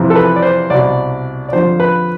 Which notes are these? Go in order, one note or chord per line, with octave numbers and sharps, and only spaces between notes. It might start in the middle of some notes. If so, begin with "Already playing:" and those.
Already playing: F2 C3 E3
A4
B4
D5
C5
C2 B2 D5
D5
F2 D3 F3 C5
B4